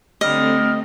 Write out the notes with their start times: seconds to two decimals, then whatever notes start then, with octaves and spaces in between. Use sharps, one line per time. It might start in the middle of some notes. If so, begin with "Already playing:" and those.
0.21 D3 G3 A3 C4 D#5 F6